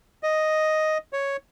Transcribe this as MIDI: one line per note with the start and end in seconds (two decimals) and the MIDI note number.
0.23 0.98 75
1.13 1.37 73